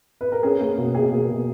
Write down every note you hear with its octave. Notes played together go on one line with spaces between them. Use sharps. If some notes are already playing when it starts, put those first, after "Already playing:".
B4
A#4
C#4 G#4
A#3
B2
B2 G#4
A#3
B2